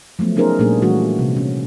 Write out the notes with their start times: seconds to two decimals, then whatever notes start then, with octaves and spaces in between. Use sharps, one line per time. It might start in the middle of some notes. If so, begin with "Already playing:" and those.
0.19 F3 F#3 A3 B3
0.36 B3 C#4 D#4 G#4 A#4 C5
0.59 A#2 G3 A3 A#3 D4 G#4
0.82 E3 G3 A3 D4 F#4
1.19 C3
1.37 C#4